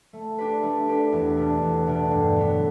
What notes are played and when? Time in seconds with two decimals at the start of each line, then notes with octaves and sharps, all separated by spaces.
0.13 A3
0.38 D4 G4 B4
0.63 A3
0.88 D4 G4 B4
1.13 E2
1.37 B2 A3 D4
1.62 E2
1.87 B2 A3 D4
2.11 G2
2.36 D3 F#3 B3